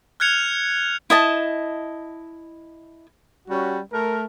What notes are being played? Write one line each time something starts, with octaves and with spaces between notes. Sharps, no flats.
F6 F#6 G#6 C#7 F7
E4 D#5 A5
G3 C#4 F#4
A3 A#4